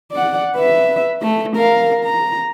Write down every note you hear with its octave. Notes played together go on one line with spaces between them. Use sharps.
D5 F#5
B4 E5
A3
A#4 F5
A#5